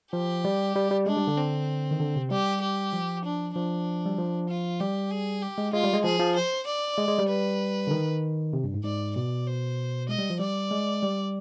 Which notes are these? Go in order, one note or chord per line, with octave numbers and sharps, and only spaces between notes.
F3 G4
G3
G3
G3
G#3 D4
G3
D3
C4
D#3
D3
C3
G3 G4
G4
F3
D4
F3 D4
G3
F3
F4
G3 G4
G#4
G4
G#3
G#3 F4
G3
G#3
F3 G#4
F3
C5
D5
G#3
G#3
G3
B4
D3
D#3
C3
G2
G#2
G#2 D5
B2 D5
C5
G#3 D#5
G3
F3
G3 D5
G#3
G3